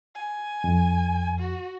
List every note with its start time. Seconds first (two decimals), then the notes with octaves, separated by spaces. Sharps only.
0.15 G#5
0.64 F2
1.39 F#4